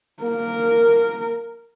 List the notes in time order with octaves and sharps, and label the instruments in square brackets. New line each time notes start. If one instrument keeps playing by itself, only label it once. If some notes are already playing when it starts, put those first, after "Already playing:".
[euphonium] A#3 [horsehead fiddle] A#4